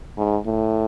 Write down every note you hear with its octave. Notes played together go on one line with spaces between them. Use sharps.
G#2
A2